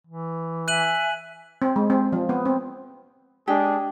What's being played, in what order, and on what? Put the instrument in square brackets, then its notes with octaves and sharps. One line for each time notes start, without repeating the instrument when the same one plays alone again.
[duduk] E3
[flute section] E5 G#5 [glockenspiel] F#6 D#7 F#7
[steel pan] C4
G#3
C4
F3
B3
C4
[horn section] G#3 D4 G#4 [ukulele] G4